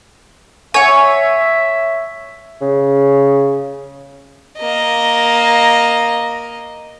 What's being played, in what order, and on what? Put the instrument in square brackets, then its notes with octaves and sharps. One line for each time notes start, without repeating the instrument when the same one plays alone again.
[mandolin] C#5 [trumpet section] E5 [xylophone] F#5 G#5
[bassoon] C#3
[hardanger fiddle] A#3 D#5